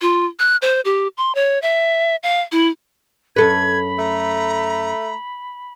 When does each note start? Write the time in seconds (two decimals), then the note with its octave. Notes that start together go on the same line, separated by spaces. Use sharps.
0.02 F4
0.39 F#6
0.62 C5
0.85 G4
1.17 C6
1.35 C#5
1.62 E5
2.23 F5
2.52 E4
3.36 F#2 A4 B4 B5 G#6
3.98 A3 A#5